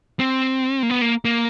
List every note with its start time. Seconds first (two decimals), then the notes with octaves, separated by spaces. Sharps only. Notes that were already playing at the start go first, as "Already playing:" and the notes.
0.19 C4
0.83 A#3
0.90 B3
1.02 A#3
1.25 A#3